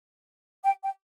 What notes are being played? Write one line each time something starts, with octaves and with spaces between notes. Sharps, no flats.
G5
G5